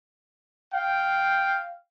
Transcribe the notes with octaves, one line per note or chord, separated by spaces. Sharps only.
F5 G5